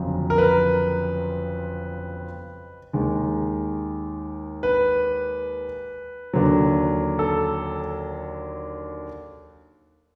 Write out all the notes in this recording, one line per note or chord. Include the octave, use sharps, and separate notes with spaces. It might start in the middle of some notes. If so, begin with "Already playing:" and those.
Already playing: G1 F2 C#3 F#3
A#4
B4
D#2 D#3 G#3
B4
D#2 D3 F#3
A4